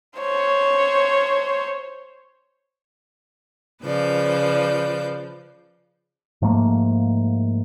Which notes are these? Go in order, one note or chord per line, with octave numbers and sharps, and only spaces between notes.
C5 C#5
C#3 F3 B4 D5 G6
G#2 F3 A3 A#3